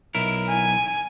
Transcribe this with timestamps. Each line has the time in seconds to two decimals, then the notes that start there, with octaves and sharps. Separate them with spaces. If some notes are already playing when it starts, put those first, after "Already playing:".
0.15 B1 E4 A#4
0.49 G#5